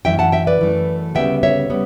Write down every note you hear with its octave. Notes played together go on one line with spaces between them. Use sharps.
F#2 E3 A3 E5 G5
F#5 A5
E5 G5
B4 D5
F#2 E3 A3
D2 C#3 G3 B3 E5 G5
C#5 E5
C#3 G3 B3